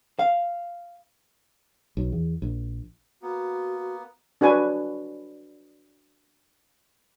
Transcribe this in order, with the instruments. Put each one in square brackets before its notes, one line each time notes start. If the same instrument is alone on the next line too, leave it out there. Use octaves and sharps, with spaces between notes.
[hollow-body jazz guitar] F5
[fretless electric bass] B1
E2
A#1
[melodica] A#3 B3 [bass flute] F#4
[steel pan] D4 F#4 B4 G#5